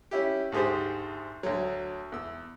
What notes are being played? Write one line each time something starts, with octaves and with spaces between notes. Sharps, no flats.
C#4 E4 G4
D2 G#2 G4 G#4 C5
D2 F#3
E2 E6